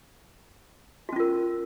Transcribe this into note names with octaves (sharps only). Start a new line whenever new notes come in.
C#4 F4 F#4 A#4